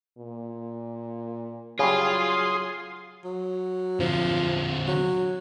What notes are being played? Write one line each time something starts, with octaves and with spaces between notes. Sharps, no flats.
A#2
C#3 F#3 G3 F4 G#4 C6
F#3
D3 F3 C4
F#3